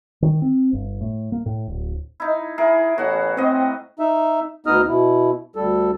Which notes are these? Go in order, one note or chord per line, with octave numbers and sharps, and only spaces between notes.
D#3
C4
G1
A2
A#3
A2
D1
D#4 E4
E4 G#4 A#4
A1 A2 B3 F#4 F#5
A2 C4 D#5
D#4 E5
D2 B3 D#4 D#5 D#6 F6
B2 E4
D2 G3 A4